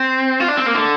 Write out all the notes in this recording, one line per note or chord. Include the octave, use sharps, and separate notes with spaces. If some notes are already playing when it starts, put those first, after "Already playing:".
Already playing: C4
F4
D4
C4
A#3
D3